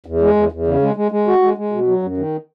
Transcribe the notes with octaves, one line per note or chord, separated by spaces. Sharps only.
E2
G#3
E2
E2
C#3
G#3
G#3
G#3
F#4
G#3
G#3
B2
F#3
F#2
D#3